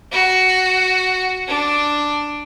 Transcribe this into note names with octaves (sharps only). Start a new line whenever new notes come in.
F#4
D4